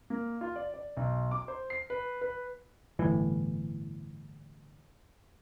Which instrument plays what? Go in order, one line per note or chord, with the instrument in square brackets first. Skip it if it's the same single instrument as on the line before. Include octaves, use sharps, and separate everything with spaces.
[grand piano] A#3
F4
D5
D5
B1
D6
C5
C7
B4
B4
[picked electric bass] G1 A2 E3